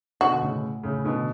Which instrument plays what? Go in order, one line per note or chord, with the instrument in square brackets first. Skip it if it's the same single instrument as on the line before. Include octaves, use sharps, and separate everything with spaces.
[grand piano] B2 D3 [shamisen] F#4
[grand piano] A2 C#3
A2 C#3
B2 D3